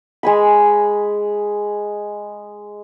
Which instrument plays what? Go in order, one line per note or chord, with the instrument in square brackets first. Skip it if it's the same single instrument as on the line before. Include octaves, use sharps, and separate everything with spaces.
[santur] G#3 G#5 B5